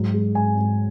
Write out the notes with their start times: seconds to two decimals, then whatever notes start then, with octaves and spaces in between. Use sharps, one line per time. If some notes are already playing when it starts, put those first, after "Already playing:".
Already playing: G#2 F#3
0.14 G#3
0.35 G#2 G#5
0.57 G#2